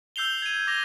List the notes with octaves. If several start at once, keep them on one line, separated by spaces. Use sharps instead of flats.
E6 G6 C7 F7 G7
G#6 D#7
D6 A#6 F7 G7